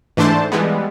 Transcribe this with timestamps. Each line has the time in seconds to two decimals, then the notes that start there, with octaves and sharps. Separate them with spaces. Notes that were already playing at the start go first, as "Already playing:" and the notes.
0.17 G#2 E3 A3 D4 C5 A5
0.52 E3 G3 G#3 B3